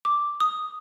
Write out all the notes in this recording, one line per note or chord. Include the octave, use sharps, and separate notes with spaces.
D6
D#6